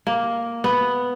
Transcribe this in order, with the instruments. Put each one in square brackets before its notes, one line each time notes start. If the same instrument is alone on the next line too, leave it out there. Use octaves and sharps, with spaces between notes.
[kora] A#3
B3